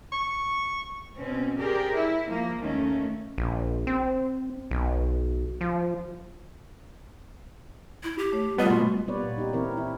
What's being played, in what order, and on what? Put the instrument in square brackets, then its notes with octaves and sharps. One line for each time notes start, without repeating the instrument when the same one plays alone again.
[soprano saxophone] C#6
[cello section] B2 C4 C#4
G4 G#4 A#4 C5 D5
E4
F3 A#3
D#2 D#3 A3 C#4
[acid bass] A#1
C4
B1
F3
[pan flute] E4
G4
[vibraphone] A3 C#5
[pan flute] G3 [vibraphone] A3 F4 [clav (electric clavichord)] B3 D#5
[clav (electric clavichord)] B2 [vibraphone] G#3 C6
[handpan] G3 A#3 B3 B4 C#5 D5
A#2
G3 D#4 G4
E3 C4 E4 A#4 C#5
E4